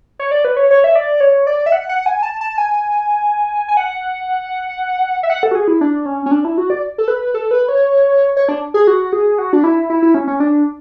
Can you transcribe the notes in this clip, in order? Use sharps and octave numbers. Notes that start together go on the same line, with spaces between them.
C#5
D5
B4
C#5
C#5
E5
D5
C#5
D5
E5
F#5
F#5
G#5
A5
A5
G#5
G#5
F#5
E5
F#5
A4
F#4
G#4
E4
D4
C#4
C#4
D4
E4
F#4
D5
A4
B4
A4
B4
C#5
C#5
D4
G#4
F#4
G#4
F#4
D4
E4
E4
E4
C#4
C#4
D4